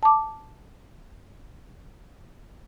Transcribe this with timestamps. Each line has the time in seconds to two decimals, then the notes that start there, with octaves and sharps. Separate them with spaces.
0.03 A5 D6